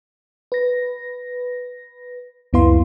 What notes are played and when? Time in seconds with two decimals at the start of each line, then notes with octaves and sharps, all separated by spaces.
0.52 B4 A#6
2.53 C#2 F#2 B3 E4 F5 C6